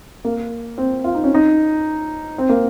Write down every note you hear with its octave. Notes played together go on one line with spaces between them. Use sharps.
A#3
C4
F4
D#4
C#4
D#4
C4
A#3